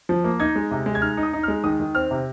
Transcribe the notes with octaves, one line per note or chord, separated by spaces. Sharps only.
F3
A#3
D#4 G#6
G#3
C3
G#3
G#6
D#4 F6
D#4
D#6
D#4
G#3 F6
D#3 D#6
D#3
C4 F6
C3